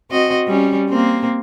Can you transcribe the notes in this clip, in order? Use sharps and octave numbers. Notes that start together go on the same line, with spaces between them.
C4 F#4 D#5
G3 C#4
A#3 C4